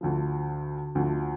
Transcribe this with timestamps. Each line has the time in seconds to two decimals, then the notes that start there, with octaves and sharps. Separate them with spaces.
0.01 D2 D3 F3
0.95 D2 D3 F3